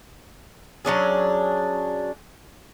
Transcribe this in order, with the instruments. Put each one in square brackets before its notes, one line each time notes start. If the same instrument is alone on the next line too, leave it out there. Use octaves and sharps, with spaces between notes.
[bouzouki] F#3 C#4 D4 G#4